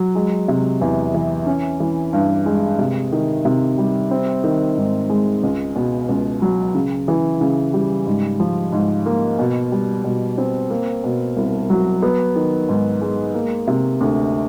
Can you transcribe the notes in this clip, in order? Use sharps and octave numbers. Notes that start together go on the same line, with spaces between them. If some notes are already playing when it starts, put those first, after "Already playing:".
Already playing: F#3
G#3
C3
E2
E3
C#4
E3
G2
G#3
C3
D#3
C3
G3
C4
D#3
G#2
G#3
C#2
B2
C#2
F#3
C#3
E3
C#3
G3
G#2
F3
G#2
A#3
B2
G3
B2
C4
A#3
B2
C2
F#3
B3
D#3
G#2
G#3
A#3
C3
D2